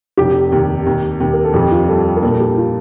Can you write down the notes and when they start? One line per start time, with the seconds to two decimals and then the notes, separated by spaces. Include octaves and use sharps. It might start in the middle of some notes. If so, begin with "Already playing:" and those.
0.17 F1 G4
0.52 D#2
0.86 D#2
1.20 D#2
1.34 A#4
1.44 A4
1.54 F2 G4
1.71 F4
1.88 G3 A4
2.06 A4
2.16 A#4
2.23 A#2 A4
2.40 G4
2.57 F4